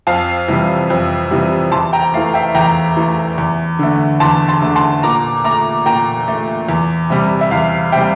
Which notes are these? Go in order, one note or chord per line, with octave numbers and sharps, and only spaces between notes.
F2 F5 A5
C3 E3 G3
F2
C3 E3 G3
E2 A5 C6
G5 A#5
E3 A3 F5
E5 G5
E2 G5 A#5
E3 A3
E2
D3 A3
E2 A5 C6
A5 C6
D3 A3
A5 C6
A#2 A#5 D6
A3 A#5 D6
A#2 G5 A#5
A3
E2
C3 G3
E5
E2 F5
C3 G3 E5 G5